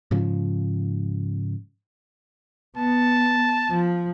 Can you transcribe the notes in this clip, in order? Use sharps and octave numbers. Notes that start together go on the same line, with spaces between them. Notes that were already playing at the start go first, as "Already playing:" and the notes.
G#2 C#3 F3
B3 A5
F3